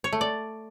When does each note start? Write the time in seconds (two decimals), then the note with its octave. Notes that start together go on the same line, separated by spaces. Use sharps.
0.04 C#5
0.13 A3
0.21 D5